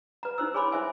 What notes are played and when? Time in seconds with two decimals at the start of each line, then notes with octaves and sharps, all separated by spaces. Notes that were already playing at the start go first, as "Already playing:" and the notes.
0.23 B4 A#5
0.38 D#4 E4 C5 E6
0.54 G#4 C#5 G#5 B5 C6 D6
0.72 E4 C5 E5 G#5